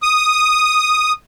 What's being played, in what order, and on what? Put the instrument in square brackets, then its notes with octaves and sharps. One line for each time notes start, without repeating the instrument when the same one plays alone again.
[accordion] D#6